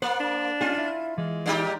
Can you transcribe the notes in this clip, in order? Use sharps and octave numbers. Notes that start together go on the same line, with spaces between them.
A#3 C5 F#5
D4
C#4 D#4 F4 G#4
E4
E3 G#3
A#2 D#4 G4